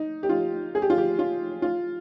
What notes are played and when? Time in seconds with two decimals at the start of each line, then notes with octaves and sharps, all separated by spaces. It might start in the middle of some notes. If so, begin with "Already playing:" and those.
Already playing: D#4
0.23 G4
0.29 F4
0.75 G#4
0.82 G4
0.90 F4
0.98 G4
1.19 F4
1.62 F4